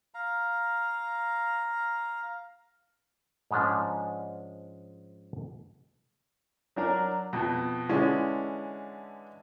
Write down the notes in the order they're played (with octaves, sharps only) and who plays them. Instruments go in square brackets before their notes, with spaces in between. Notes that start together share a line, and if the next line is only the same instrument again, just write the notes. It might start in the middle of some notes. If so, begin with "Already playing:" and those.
[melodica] F5 A#5
[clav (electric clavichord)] G#2 F3 G#3 C#4 D4
[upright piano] F#3 D4 A#4
F2 B2
D3 E3 G#3 C#4 D4